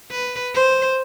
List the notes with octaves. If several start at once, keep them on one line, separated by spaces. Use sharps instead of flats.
B4
C5